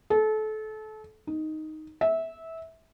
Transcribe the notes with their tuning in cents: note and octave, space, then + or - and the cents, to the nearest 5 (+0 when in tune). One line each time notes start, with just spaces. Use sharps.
A4 -30
D#4 +0
E5 -15